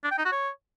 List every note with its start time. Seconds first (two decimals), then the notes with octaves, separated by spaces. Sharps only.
0.04 D4
0.11 G5
0.18 D#4
0.25 F#4
0.32 C#5